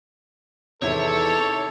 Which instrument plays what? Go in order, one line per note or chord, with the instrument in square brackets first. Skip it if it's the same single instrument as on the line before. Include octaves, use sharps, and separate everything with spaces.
[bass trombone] E2 [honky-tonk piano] C3 D#3 E4 [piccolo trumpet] A4 [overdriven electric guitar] C#5